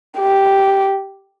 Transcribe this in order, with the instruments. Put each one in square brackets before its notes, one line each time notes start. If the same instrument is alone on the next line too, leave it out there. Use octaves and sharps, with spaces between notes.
[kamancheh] G4